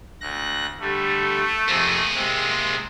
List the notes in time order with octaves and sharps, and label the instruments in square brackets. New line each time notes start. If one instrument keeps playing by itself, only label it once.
[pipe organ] D2 F#6 A#6
[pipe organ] D3 G3 [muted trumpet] A3
[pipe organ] F2 C3 C4 [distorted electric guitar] A#3 G#4
[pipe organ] C3 G#3 C4